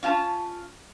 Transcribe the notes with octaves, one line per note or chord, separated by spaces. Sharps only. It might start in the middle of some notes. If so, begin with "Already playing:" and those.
C#4 F4 G5 A5